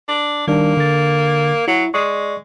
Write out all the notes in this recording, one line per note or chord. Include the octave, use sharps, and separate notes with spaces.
D4
D#3 G3 A#3 D4
D3 A6
F#3 E4
G#3 D5 C#6